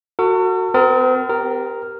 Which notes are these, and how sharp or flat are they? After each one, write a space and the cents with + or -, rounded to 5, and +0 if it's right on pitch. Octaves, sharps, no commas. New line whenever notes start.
F#4 +0 A4 +45
C4 -45 A#4 +0
G4 +0 A#4 +0